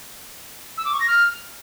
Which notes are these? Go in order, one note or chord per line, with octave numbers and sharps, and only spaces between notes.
E6
D6
C#6
A#6
F6